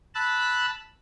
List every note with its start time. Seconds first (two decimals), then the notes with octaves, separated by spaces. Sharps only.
0.15 A5 B5 E6 F#6